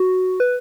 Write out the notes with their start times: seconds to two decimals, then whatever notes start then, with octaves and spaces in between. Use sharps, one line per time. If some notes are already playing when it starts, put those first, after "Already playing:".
Already playing: F#4
0.40 B4